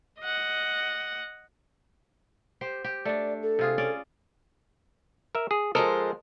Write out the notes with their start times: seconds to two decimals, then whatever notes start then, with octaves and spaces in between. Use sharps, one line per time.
0.20 D#5 F#5
2.61 G4 C5
2.84 G4
3.05 A3 D4 D5
3.43 A4
3.59 C3 F4 G#4
3.78 C#4 D5
5.35 A#4 E5
5.51 G#4
5.75 F3 G#3 A4 A#4 C5 D#5